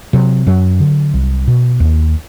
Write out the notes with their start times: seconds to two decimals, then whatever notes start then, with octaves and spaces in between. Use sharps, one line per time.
0.13 C3 F#3
0.47 F#2 F#3
0.80 D3
1.14 C2
1.48 B2
1.80 D#2